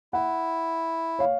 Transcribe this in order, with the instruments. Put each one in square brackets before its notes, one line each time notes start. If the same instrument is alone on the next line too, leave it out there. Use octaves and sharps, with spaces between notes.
[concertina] E4 [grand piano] F#5
[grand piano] C#5 F5